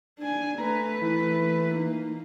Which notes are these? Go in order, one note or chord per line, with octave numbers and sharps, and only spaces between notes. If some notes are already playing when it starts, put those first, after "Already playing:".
D4 G#5
A3 B4 A#5
E3
A#3 D#4